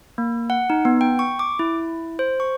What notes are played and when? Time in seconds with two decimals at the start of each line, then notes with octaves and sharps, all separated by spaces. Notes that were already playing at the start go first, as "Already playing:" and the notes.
0.18 A#3
0.50 F#5
0.70 D#4
0.85 B3
1.01 G5
1.19 C#6
1.39 D6
1.59 E4
2.19 C5
2.40 C#6